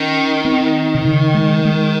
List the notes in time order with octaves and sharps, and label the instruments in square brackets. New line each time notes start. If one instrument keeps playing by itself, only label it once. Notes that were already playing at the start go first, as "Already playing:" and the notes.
Already playing: [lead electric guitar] D#3 [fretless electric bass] C#4
[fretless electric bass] C4
C3
C#3
G#3
G#3